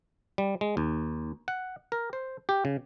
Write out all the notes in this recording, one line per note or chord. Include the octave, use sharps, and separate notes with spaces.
G3
G#3
D#2
F#5
A#4
C5
G4
C#3